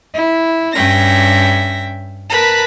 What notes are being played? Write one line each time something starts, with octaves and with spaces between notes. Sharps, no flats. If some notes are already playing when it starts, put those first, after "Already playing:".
E4
G2 C#4 E5 G5 A#6
A#4 B4 A5 B5